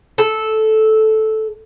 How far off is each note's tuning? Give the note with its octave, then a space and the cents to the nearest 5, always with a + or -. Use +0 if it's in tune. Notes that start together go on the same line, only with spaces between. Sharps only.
A4 -10